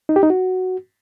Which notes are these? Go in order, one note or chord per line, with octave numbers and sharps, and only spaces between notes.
D#4
G4
D#4
F#4